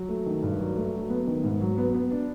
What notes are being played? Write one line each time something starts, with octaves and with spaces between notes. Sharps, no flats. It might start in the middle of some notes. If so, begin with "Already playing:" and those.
Already playing: F#3
A3
D#3
G2
F#3
A3
F#3
B3
D#3
G#2
F#3
B3
B3
D4